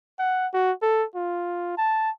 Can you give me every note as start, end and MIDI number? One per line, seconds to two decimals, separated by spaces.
0.19 0.47 78
0.53 0.72 66
0.82 1.04 69
1.15 1.76 65
1.78 2.10 81